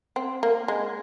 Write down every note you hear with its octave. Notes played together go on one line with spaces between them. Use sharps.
C4
A#3
G#3